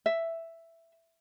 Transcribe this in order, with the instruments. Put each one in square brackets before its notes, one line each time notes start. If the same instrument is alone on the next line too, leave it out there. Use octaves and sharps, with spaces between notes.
[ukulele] E5